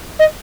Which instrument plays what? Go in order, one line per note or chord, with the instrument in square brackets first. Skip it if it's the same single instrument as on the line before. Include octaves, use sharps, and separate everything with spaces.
[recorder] D#5